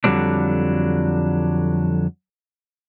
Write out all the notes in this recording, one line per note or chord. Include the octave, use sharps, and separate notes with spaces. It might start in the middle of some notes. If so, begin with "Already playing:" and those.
F2 D3 F#3 G3 C4 D4